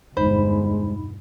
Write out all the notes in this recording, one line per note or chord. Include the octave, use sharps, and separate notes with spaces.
G1 E2 B2 G#3 D#4 C5 B5